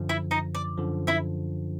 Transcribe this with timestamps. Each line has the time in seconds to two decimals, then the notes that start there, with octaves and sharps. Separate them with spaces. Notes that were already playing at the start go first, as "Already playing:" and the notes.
Already playing: F#2 D3 F3
0.09 E4 E5
0.31 D#4 D#5
0.55 D5
0.77 F#2 D3 F3
1.07 E4 E5